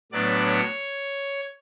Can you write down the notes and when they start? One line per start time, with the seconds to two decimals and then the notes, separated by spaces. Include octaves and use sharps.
0.12 A2 F#3 B3 D4 D5
0.46 C#5